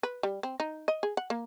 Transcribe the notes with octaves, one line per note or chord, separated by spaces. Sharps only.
B4
G3
C4
D#4
D#5
G#4
F#5
A#3